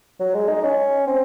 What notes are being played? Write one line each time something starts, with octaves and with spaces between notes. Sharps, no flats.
F#3
G#3
D#4
C#4
C4